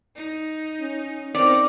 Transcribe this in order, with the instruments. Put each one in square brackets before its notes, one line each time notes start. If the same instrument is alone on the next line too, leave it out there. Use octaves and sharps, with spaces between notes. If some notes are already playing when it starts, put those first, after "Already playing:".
[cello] D#4
[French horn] C#4
[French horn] C4 [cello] D#4 A#4 [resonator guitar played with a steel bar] D5